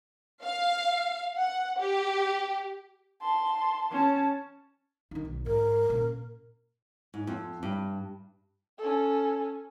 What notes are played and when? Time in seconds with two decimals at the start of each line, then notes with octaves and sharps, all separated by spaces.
0.44 F5
1.36 F#5
1.78 G4
3.22 A5 C6
3.91 C#4 A5
5.11 D#3 D#4
5.25 B1
5.46 G#2 A#4
5.89 A#2 C#3
7.14 G#2
7.27 F2
7.63 G2
8.78 C#4 A4